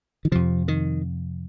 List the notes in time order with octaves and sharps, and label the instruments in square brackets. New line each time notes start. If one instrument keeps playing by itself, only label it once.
[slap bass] D#3
F2 C3 F3
D#3